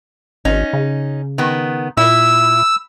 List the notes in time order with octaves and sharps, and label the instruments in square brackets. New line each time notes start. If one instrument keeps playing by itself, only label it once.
[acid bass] G#1 [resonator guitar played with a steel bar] C#4 D#4
[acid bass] C#3
[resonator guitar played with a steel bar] D#3 B3
[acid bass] A#2 [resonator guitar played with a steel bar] E4 [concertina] E6